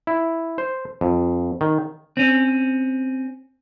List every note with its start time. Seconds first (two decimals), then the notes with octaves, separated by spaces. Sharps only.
0.07 E4
0.58 C5
1.01 F2
1.61 D#3
2.17 C4 C#4